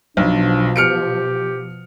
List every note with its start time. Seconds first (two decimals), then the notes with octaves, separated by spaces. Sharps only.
0.17 B1 B2 F3 D4
0.76 G4 F6 C#7 D7